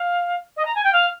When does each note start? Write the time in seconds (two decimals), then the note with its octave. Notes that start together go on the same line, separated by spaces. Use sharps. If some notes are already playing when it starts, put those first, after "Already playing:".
Already playing: F5
0.57 D#5
0.65 A#5
0.75 G#5
0.84 G5
0.93 F5